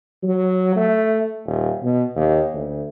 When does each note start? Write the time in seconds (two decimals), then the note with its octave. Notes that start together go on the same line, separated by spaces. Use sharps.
0.23 F#3
0.76 A3
1.46 D#1
1.83 B2
2.15 D#2
2.54 D2